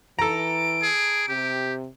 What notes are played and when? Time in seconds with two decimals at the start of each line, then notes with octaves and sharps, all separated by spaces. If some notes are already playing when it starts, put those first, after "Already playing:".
0.19 E3 A4 A#5 D7
0.83 G#4
1.29 C3 G4